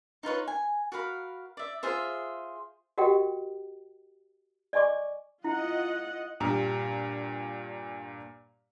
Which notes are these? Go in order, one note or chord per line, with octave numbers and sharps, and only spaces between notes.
D#4 F4 B4 C#5
G#5
F#4 A#4 F5 B5
D5 E5
F4 G#4 C5 E5
F#4 G4 A#4 D#5 F#5 G5
D5 D#5 G#5 C#6 D6
E4 F4 D#5 F#5
G2 A#2 G3 A#5